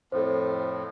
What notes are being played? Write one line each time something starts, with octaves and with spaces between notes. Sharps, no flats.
F2 A2 A4 C5